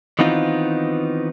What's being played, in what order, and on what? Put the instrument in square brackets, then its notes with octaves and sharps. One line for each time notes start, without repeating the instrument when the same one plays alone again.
[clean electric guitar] D#3 E3 B3 C4 D#4 F4